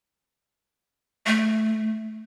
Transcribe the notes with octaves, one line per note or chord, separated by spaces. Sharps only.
A3